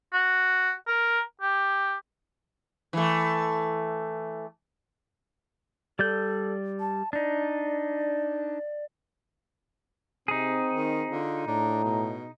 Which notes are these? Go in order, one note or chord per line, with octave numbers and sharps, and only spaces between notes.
F#4
A#4
G4
E3 A3
G3 A4 D5 G6
A5
D4 D#4 D5
C3 C4 D#4 G#4
D#3
D3 F4
A2 D4 A#5
B2